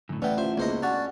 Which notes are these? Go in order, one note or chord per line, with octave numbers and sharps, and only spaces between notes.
F#2 A2 D3
A1 E3 B3 C#4 D5 G5
F4 C5 E5
C#2 A#3 B3 C5 D#5
C#4 D4 F#4 A6